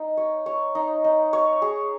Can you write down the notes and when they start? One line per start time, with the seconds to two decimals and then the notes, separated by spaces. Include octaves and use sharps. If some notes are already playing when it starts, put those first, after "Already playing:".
Already playing: D#4
0.17 C#5
0.46 C#5
0.75 D#4
1.04 D#4
1.33 C#5
1.62 G#4